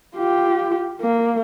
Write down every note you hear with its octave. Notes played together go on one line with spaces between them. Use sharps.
F4 G4
A#3